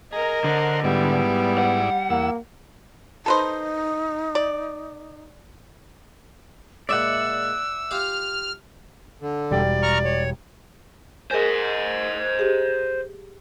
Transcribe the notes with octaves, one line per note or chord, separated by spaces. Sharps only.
G#4 A#4 D#5 A#5
D3 C5 F#5
G#2 G3 B3 E4 D5
F#5
E2 A#3 E6
D#4 A4 B4 C5
D5
A#2 G#3 D5 E5 F#5 E6
F4 G4 F5 F6
D3
E1 G3 D5 G5
A#5 C#6 F6
C#5
G#4 A#4 C5 D#5 G#5
G4 G#4